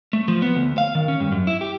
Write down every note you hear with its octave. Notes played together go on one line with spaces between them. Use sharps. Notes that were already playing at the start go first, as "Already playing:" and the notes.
A3
F3
B3
D2
F5
D#3
C#4
G2
F#2
E4
G4